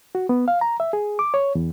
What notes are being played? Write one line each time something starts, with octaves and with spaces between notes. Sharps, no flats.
F#4
B3
F5
A#5
E5
G#4
D6
C#5
E2